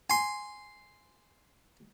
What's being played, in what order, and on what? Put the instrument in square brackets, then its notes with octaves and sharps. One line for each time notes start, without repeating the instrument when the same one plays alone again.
[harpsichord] G#5 C6